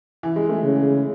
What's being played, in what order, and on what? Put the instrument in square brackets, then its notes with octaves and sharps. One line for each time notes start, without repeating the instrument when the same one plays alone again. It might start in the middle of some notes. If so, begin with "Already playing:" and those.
[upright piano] E3
G#3
A3
[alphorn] C#3